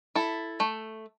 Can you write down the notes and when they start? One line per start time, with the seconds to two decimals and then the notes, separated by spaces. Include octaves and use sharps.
0.15 E4 A4
0.60 A3